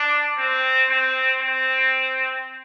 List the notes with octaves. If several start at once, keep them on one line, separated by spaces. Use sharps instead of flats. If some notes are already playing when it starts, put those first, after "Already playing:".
Already playing: D4
C4
C4
C4